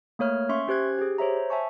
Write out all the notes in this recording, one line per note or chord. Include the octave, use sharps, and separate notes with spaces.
A3 A#3 C#5 F6
C#4 E5 C6 C#6
C#4 G4 C5 F#6 G#6
G4 G#4
C5 C#5 E5 A#5
E5 G#5 A5 C#6